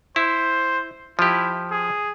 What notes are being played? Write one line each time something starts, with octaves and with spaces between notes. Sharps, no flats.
E4 C5
F3 E4 G4
G#4